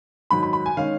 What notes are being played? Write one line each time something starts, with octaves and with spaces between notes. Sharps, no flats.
G#2 D#3 F#3 B5
B5
B5
G#5
D#3 G#3 C#4 F5